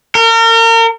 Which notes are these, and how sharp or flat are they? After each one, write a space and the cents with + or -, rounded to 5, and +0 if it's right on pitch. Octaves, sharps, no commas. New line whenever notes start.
A#4 -35